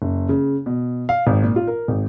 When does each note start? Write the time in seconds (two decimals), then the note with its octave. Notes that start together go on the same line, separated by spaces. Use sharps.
0.02 F#1
0.29 C#3
0.66 B2
1.09 F5
1.27 G#1
1.42 A#2
1.56 F4
1.67 A#4
1.88 G#1